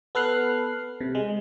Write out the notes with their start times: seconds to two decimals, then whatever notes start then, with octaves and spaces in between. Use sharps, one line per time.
0.15 B3 A4 B4 F6 F#6 C7
1.01 C3
1.15 G#3